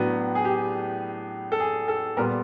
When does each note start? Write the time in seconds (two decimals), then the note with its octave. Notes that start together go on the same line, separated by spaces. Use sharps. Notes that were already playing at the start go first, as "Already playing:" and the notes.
Already playing: A2 F#3 B3 D4
0.35 G#4
0.45 G4
1.52 A4
1.60 G#4
1.88 A4
2.17 A#2 G3 B3 A#4